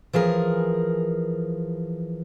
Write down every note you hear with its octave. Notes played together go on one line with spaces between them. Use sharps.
E3 F3 G#4 A#4